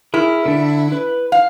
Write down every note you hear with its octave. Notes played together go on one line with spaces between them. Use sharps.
E4 G#4 A#4 F6
D3 D4
B4
F5